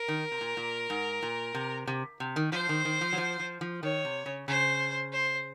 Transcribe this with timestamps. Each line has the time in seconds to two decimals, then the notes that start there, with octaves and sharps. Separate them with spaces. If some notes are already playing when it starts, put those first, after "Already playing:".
Already playing: A#4
0.08 D#3
0.32 C3
0.41 A#2
0.57 A#2
0.90 G#2
1.23 A#2
1.54 C3
1.87 C3
2.20 C3
2.36 D#3
2.52 F3 C5
2.69 D#3
2.85 D#3
3.01 F3
3.13 F#3
3.18 F3
3.39 F3
3.61 F3
3.83 D#3 C#5
4.05 C3
4.26 C#3
4.48 C#3 C5
5.13 C5